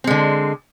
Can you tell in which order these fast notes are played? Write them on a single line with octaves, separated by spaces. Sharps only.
C4 G#3 D3